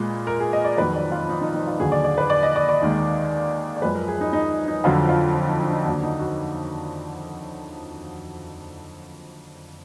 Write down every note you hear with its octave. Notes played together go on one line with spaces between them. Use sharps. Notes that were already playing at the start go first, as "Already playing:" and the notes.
Already playing: A#2 G#3 B4
A#4
G#4
D#5
D5
F2 D#3 F#3 B4
D5
F4
D#4
D#4
D#4
F4
D#2 D3 F#3 G#4
D5
D5
B4
D5
D#5
D5
D5
D#2 D#3 G#3
D5
F#2 F3 G#3 B4
A#4
G#4
D#4
D#4
D#4
F2 D3 F#3 F4
F4
F4
D#4
D4
D#4
D#2 D3 F#3 D4
D#4
F#4